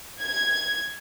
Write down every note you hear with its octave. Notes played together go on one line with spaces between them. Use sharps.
G#6